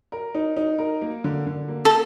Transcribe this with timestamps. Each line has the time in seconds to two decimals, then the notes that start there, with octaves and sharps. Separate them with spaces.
0.12 A#4
0.35 D#4
0.57 D#4
0.79 A#4
1.01 A#3
1.24 D3
1.47 D3
1.68 A#3
1.85 A4